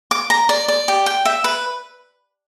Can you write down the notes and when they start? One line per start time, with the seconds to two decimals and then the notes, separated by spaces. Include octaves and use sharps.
0.11 D6
0.30 A#5
0.49 D5
0.68 D5
0.88 G4
1.06 G5
1.25 E5
1.44 B4